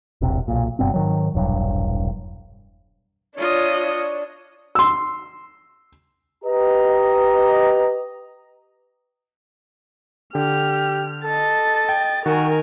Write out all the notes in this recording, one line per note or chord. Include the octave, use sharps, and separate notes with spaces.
E1 A#1 C3
B1 A#2
F#1 G2 B2 C4
G#2 D#3 F#3
E1 A#1 G2 F#3
D4 F4 C#5 D#5
C6 E6
G4 B4 D#5 A#5
D3 G4 F6
A4 D#5 A6
G5
D#3 F#4 A#4 G#5